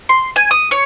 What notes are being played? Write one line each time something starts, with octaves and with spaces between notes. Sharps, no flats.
C6
G#5
D#6
C#5